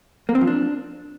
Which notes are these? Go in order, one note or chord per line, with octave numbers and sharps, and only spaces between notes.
A#3
C4
F3
D4